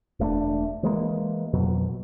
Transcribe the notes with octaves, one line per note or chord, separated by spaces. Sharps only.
E1 A3 B3 D4
E3 G#3 A#3
F2 B2 F#3